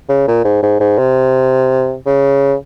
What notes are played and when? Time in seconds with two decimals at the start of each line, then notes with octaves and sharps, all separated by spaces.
0.09 C#3
0.28 A#2
0.44 G#2
0.63 G#2
0.80 G#2
0.98 C3
2.06 C#3